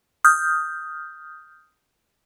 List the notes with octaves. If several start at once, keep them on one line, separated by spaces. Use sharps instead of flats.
D#6 F6 G6